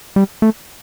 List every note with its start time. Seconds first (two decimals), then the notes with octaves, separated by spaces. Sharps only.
0.16 G3
0.42 A3